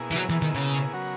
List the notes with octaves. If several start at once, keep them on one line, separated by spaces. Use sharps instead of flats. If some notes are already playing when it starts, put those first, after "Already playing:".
Already playing: B2 A#3 E4 G#4
E3
F#3
E3
D#3
C#3
C#3 F#3 B3 F#4 A#4